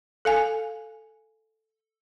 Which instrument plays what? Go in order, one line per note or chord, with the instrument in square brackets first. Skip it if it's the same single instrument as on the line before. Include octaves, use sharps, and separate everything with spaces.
[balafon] A4 F5 G#5